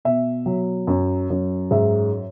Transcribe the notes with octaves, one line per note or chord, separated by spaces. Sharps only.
B2 E5
F#3
F#2
F#2
G#2 E5